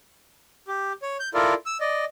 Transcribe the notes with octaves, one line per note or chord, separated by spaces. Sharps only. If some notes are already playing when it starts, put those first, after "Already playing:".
G4
C#5
G6
E4 F4 A4 A#4 D5
E6
D5 D#5